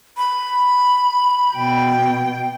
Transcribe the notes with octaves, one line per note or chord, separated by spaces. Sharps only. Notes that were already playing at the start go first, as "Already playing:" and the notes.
B5
B2 G5